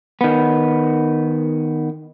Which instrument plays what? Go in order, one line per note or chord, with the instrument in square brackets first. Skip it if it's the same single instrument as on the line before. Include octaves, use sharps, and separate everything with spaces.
[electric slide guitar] D#3 B3